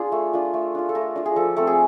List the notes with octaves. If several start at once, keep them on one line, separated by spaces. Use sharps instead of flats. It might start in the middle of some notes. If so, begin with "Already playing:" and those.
Already playing: D4 F4 G#4
A3
D4 F4
A3
D4 F4
A4
A3 A#4
D4 F4
G#4
F3 A4
A3 C4 A4
G#4